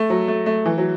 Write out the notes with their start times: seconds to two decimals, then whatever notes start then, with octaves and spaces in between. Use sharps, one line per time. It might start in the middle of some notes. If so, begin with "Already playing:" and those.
Already playing: A3
0.10 F#3
0.28 A3
0.46 A3
0.65 E3
0.78 F#3